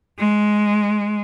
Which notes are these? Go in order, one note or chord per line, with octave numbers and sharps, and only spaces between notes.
G#3